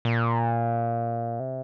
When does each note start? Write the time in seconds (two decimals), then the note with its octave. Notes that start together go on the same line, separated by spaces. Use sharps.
0.05 A#2
1.40 C3